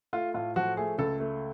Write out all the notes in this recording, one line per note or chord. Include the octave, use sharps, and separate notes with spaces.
A3 F4
A2 F4
F3 F#4
A3 G#4
C#2 A4
A3